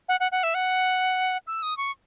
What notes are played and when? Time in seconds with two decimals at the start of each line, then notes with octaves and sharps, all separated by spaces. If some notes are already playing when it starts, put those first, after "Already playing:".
0.09 F#5
0.20 F#5
0.32 F#5
0.43 E5
0.54 F#5
1.47 E6
1.63 D#6
1.77 C#6